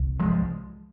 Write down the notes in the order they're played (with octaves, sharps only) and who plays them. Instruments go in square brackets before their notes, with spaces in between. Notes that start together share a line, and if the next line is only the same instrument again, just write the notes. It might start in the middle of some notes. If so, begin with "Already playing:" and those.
Already playing: [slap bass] C2
F3 G#3